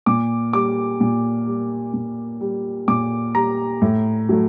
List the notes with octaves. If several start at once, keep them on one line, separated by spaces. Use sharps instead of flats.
A#2 D6
G3 D6
A#2
G3
A#2
G3
A#2 D6
G3 A#5
A2
F#3 A3